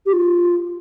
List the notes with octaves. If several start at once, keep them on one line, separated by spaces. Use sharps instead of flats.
G4
F4